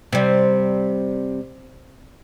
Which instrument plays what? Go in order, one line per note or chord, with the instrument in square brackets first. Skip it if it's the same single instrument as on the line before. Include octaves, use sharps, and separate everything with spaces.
[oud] C3 G3